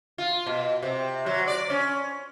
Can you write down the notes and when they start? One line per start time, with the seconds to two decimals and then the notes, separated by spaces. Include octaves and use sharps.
0.18 F4
0.47 B2
0.83 C3
1.26 F#3
1.48 D5
1.70 C#4